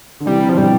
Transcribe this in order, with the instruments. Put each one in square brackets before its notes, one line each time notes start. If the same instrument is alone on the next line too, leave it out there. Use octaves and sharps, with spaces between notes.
[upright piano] D3
[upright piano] C3 E3 [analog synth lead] G3
[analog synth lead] F3
[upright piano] B2 D3 [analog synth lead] G3